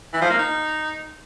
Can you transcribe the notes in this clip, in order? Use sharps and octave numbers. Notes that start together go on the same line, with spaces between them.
E3
F3
A#3
D#4